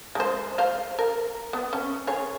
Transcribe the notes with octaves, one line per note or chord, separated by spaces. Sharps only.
G#3 C5
C5 F5
A#4
B3
C#4
G#4 C#5